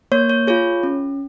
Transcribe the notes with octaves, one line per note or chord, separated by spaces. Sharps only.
A#3 C#5
C#5
F4 G#4 C#5
C#4